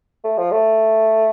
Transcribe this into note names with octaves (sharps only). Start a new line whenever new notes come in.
A3
F3
A3